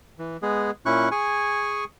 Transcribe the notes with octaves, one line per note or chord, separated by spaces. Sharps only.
E3
G#3 B3 G#4
A#2 C#4 E4 C#6 F#6
G#4 G#5 C#6